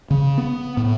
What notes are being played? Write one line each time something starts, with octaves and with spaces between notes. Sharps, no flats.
C#3
B3
A2